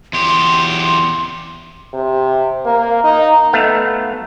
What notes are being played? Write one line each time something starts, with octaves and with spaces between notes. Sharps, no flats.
E2 G4 C6
C3
A#3
D#4
A3 B3 F5